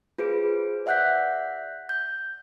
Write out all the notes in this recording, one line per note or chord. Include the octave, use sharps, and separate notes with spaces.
F4 G#4 B4 C5 D7
D5 E5 F#5 F#6 G6 B6
G6